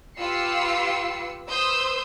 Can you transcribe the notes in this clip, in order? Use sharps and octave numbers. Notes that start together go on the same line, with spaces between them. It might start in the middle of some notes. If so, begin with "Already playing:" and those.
F4 G4 B4 E6 C7 C#7
B4 C5 C6 D#6 E6 G6